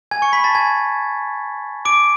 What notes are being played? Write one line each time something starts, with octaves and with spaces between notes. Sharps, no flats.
G#5 G#6
C#6 C#7
B5 B6
A5 A6
G#5 G#6
D6 D7